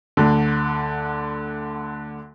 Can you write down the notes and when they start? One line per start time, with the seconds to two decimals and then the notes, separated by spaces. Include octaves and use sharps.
0.17 D2 D3